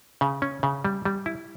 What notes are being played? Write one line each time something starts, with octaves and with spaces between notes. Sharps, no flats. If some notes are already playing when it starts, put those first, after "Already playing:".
C#3
C#4
C#3
G3
G3
E4